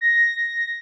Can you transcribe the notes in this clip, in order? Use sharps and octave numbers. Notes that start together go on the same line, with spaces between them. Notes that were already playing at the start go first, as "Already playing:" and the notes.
A#6